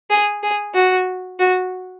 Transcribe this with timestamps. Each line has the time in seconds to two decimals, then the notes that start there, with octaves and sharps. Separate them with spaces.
0.10 G#4
0.43 G#4
0.75 F#4
1.39 F#4